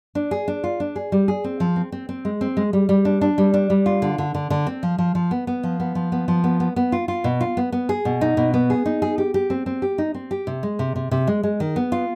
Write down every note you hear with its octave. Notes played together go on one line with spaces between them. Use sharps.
D4
G#4
D4
F4
D4
G#4
G3
G#4
C4
F3
C4
C4
C4
G#3
C4
G#3
G3
G3
D4
D4
G3
D4
G3
F4
D3
D3
D3
D3
C4
F3
F3
F3
B3
B3
F3
B3
F3
B3
F3
B3
B3
B3
F4
F4
B2
F4
B3
B3
G#4
B2
D#4
B2
B3
G#4
D#4
G#4
G4
G4
C4
C4
G4
D#4
C4
G4
C3
G#3
C3
C3
C3
G#3
G#3
D#3
B3
F4